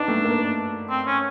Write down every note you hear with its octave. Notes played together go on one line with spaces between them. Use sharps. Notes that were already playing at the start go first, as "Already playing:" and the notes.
Already playing: B3 D4 D#4
A3
A#3
C4
C#4